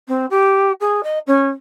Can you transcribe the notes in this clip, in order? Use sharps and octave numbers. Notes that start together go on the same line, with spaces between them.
C4
G4
G#4
D#5
C#4